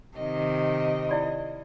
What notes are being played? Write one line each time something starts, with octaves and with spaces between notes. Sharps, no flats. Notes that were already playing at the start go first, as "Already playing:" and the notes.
C3 D#3 D#5
E4 D5 B5